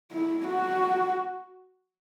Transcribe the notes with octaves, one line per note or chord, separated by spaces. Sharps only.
E4
F#4